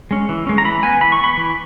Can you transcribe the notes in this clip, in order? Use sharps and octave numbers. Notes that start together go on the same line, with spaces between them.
G#3 C#4
E3
G#3 C#4
A#5
E3 B5
B3 G#5
E3 B5
C#6
B3 B5
E3